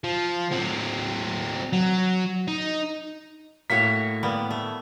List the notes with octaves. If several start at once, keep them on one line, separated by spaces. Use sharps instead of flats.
F3
F#3 C4
F#3
D#4
A2 A#3 F#4 C#5 B6
G3 A#3 B3
A3